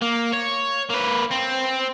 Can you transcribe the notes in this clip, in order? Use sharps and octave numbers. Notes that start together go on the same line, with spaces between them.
A#3
C#5
A#3 B4
C4